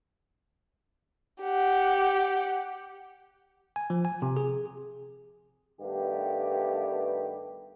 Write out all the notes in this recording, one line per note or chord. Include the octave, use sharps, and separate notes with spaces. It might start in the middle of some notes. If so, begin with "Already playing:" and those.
G4 F#5
G#5
F3
G#5
C3
G#4
G2 D#3 A3 B3 G4